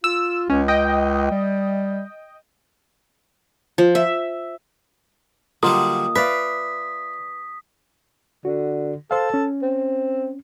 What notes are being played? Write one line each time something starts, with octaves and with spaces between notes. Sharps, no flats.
F4 E6
C#2 C#4
D#5 G5
G3
F3
E5
D3 F#3 G3 A#3 F4 D#5 D#6
B4 D5 E5 F5 B6
D3 F#4
A4 C5 F5
C#4
C4